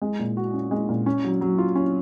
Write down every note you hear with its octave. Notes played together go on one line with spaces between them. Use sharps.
G#3
A#2
F#4
C#4
G#3
A#2
C#4
F#3
F#3
F4
C#4